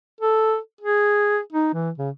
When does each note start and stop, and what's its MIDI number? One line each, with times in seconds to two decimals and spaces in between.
0.21 0.57 69
0.81 1.39 68
1.53 1.69 63
1.74 1.90 52
1.98 2.09 49